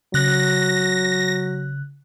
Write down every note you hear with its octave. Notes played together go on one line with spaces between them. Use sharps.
C#3 F#3 F#6 A#6